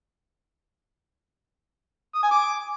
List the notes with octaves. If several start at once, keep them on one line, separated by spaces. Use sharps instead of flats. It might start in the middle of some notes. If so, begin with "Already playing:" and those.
D#6
G#5
D6